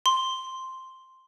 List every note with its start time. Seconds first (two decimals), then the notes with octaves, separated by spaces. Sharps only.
0.06 C6